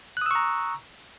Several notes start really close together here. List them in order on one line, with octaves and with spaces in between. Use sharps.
F#6 D#6 E6 C#6 A#5